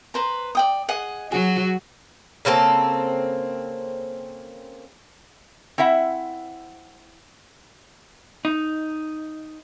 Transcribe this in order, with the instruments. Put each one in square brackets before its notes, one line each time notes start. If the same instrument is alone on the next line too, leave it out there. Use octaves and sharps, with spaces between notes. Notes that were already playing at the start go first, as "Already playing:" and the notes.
[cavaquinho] B4 C5 A#5
D5 G5 D#6
G#4 D#5 F#5
[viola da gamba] F#3 F#4 [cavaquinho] G#4
[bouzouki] C#3 A#3 C4 A4
[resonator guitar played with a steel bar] C4 E4 E5 F#5
[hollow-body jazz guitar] D#4